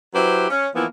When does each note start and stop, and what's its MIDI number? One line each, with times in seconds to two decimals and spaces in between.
0.15 0.45 54
0.15 0.45 64
0.15 0.45 67
0.15 0.45 71
0.15 0.45 72
0.50 0.68 61
0.75 0.86 52
0.75 0.86 53
0.75 0.86 58
0.75 0.86 59
0.75 0.86 64